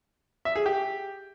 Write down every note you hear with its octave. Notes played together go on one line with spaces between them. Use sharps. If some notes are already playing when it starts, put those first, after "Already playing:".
E5
G#4
G4